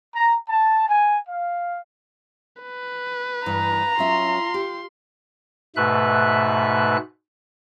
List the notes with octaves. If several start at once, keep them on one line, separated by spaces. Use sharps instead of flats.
A#5
A5
G#5
F5
B4
G2 E3 A#5
F#3 C#4 F4 E5 C6
G4
G#2 B2 A3 B4 E5 F#6